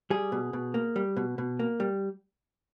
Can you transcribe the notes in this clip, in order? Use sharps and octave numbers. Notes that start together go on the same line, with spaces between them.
G3 G#4
B2
B2
A#3
G3
B2
B2
A#3
G3